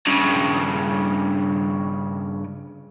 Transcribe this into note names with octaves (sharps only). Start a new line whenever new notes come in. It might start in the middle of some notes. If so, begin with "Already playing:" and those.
G2 C#3